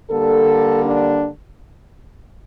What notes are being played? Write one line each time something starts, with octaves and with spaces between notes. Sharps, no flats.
D3 G3 A#3 A4
D4